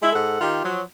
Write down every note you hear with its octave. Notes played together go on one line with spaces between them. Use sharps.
G#3 E4
G#2 A4 F#5
D#3 F4 G4
F3 F#3